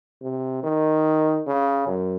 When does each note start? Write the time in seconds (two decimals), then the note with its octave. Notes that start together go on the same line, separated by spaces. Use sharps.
0.22 C3
0.63 D#3
1.47 C#3
1.87 F#2